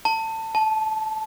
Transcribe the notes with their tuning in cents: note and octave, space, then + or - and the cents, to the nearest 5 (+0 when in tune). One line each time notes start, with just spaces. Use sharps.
A5 +25
A5 -15